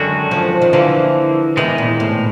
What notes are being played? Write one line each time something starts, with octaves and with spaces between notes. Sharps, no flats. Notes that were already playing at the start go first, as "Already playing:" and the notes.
Already playing: F#2 D3 D#3 G#3 C#4 F#4
F3
D#3
D3 E3 F3 A#3
E2 C3 D#3 E3 G#3
A#2
A2